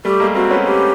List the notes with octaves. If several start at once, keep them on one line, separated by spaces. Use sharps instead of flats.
G3 A3 G4
G#3 A#3
A#3 C4 F#4
B3 C#4
G4